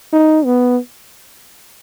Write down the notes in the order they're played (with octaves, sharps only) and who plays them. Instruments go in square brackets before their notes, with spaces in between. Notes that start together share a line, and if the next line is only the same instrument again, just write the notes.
[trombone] D#4
B3